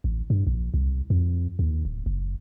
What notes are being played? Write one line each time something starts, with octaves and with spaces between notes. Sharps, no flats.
A1
G2
A#1
C2
F2
D#2
D1
F#1